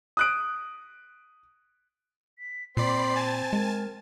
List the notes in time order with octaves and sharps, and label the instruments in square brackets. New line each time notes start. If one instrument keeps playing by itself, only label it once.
[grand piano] D#6 F#6 D7
[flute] B6
[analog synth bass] A#2 [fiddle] C4 [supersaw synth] D5 B5 C7 [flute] C6
[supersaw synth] G#5 A5 A6
[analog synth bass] G#3 [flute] A#4